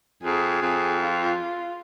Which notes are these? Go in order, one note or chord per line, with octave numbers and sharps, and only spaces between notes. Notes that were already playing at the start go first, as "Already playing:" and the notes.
F2 G#4
F2
F4